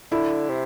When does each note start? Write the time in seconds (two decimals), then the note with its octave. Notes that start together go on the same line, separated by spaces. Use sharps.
0.12 D3 E4
0.49 C3